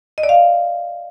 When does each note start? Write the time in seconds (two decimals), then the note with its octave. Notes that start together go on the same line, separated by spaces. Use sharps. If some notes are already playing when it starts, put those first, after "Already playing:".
0.18 D#5
0.23 D5
0.29 F5